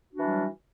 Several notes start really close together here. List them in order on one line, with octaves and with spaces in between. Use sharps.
F#4 D4 E3 G3 F#3